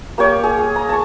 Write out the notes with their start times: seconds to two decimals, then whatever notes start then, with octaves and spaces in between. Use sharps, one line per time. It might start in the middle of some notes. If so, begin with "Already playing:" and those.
0.18 A#3 G4 C#5 G5
0.43 G#4
0.58 G#4
0.76 A#5
0.89 A5 C#6